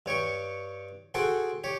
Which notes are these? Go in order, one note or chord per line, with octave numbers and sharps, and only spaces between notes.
G2 C#5 G5 C#6
F#4 G#4 A4 C5 G5
G4 C#5